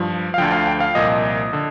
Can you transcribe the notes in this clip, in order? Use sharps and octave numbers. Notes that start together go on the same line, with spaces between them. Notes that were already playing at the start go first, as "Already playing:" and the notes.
Already playing: G2 F3
F5
D2 D3 F3 G5
F5
G5
F5
C2 A#2 F3 D#5
D3